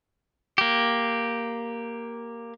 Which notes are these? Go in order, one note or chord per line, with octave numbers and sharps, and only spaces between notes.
A#3 G4